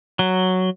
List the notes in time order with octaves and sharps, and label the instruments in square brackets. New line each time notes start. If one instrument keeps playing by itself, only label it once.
[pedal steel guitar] F#3